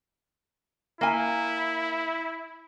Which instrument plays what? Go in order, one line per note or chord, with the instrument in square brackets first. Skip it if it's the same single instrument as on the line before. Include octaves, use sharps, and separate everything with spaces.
[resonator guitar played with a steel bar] A#3 G#5 [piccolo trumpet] E4